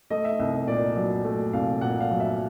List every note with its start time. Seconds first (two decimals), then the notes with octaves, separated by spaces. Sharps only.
0.10 A3 D#5
0.25 E5
0.39 C2 E5
0.54 D#5
0.67 A#2 D5
0.96 F#3
1.25 A3
1.53 C2 F5
1.81 A#2 F#5
2.00 F5
2.11 F#3
2.20 E5